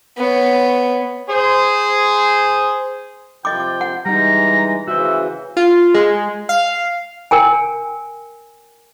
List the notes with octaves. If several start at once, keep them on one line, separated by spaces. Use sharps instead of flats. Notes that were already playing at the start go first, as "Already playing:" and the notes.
B3 C#5
G#4 C5
C3 F3 F4 D#5 G5 D6
F#5
E3 G3 G#3 D#4 A#5
C#3 E3 F#4 C5 E5
F4
G#3
F5
A#4 G5 G#5